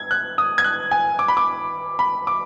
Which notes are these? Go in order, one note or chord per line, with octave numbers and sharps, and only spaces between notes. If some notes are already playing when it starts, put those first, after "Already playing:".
Already playing: G#6
F#6
D#6
G#6
F#6
G#5
D6
B5
D6
B5
D6